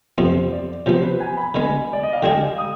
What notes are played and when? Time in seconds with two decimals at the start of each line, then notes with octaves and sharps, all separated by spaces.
0.18 F2 C3 F3 B3 C5
0.52 D5
0.86 C3 F3 B3 C5
1.03 B4
1.20 G#5
1.37 B5
1.54 D3 G#3 B3 G#5
1.93 D5
2.03 D#5
2.13 F5
2.22 D3 G#3 D4 G#4 G5
2.58 D#6